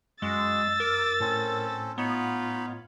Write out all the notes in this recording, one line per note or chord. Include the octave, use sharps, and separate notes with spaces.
F#2 G#3 F#4 G#4 E6 A6
A#4 D6
A2 C4 C#4 A4
B3 D#4 F4 C#5 B5